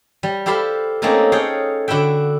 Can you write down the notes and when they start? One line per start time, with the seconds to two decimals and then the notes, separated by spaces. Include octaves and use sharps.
0.23 G3
0.46 E4 G4 A4 C5 F5 B5
1.02 A3 A#3 C4 C#4 D#4 A4
1.32 G#4 A4 C#5 F5 G5
1.88 D3 E4 F#4 E5 G5